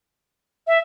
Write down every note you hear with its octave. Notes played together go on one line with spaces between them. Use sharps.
E5